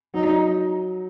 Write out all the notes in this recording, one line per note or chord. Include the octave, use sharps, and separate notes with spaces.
F#3 D#4